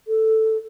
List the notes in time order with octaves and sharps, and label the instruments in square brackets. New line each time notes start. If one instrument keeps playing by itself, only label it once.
[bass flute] A4